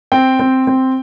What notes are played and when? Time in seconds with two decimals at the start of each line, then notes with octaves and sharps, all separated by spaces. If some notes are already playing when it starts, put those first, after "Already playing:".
0.12 C4 G5
0.39 C4
0.67 C4